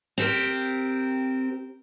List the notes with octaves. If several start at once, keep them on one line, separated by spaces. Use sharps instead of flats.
C4 G4 A#4